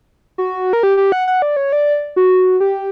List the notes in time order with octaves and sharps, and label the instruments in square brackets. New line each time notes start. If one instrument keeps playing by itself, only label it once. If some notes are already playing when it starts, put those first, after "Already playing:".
[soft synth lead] F#4
A#4
G4
G4
F#5
F#5
D5
C#5
D5
F#4
G4